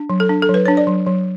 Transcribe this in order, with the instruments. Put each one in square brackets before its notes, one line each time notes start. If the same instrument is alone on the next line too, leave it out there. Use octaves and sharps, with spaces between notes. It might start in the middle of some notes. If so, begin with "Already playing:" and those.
Already playing: [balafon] D4
F#3
A4
D4
A4
F#3
B4
D4 C#5
D5
F#3
F#3